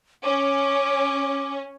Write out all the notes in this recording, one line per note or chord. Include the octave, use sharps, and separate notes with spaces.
C#4 D6